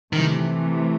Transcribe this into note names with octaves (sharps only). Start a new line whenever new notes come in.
C3 D#3 E3 A3